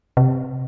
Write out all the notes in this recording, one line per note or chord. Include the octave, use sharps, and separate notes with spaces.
C3